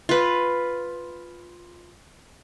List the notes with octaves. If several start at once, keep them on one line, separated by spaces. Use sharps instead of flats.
F4 B4